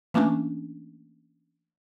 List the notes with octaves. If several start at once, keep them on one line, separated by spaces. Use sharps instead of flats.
E3 A3 A#3 C#4 D4